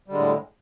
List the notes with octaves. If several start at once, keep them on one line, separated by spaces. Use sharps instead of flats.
A2 D3 G3 G#3